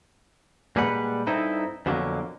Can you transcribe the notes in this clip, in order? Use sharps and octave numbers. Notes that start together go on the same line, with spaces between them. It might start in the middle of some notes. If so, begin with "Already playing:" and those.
A#2 G3 G#3 B4 F#5 B5
G2 C4 D#4 E4 A4
F2 B2 D3 F#3 G3 A#3